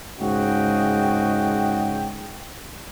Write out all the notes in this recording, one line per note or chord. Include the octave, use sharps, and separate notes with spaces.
G#2 C#3 F#4 D#5 G5